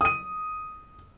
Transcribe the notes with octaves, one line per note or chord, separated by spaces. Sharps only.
D#6 D#7